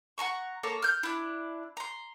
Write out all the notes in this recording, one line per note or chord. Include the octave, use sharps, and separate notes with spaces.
F#5 A5 A#5 C#6
A#3 A4 C#5 A#5
F6 G6
D4 E4
A#5 C6